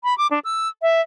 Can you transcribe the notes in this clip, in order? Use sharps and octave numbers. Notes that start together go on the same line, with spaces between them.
B5
D6
D4
E6
E5